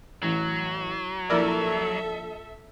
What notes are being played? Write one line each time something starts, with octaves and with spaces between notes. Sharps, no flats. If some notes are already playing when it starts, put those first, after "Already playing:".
A1 F#3
A#1 E4 A4 A#4 D5 E5 E6